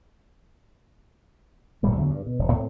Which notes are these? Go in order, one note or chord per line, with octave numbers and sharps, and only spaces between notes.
F1 A#2 G3 A3
E2 D3 F#3 A3
G2
B2
F1
A2 A3 C4